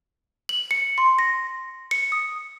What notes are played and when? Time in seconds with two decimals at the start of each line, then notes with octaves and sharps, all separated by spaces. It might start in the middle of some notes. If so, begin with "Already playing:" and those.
0.49 F#7
0.71 C#7
0.98 C6
1.19 A#6
1.91 C#7
2.12 D#6